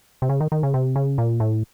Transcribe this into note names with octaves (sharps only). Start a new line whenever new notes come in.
C3
C#3
D#3
D#3
C#3
C3
C#3
A#2
A2